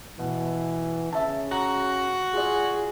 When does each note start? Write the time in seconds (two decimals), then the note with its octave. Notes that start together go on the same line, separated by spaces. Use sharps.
0.19 B2 E3
1.13 C#3 E5 A5
1.52 F#4 A#5
2.34 F4 G#4 D5